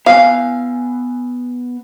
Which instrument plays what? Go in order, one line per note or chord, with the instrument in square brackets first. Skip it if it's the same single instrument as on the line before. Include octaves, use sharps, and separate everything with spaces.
[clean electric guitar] B3 G#5 [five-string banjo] F5